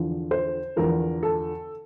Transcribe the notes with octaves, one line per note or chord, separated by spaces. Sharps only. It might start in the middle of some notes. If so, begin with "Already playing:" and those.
Already playing: E2 D3 F3
C5
E2 D3 F3 A#4
A4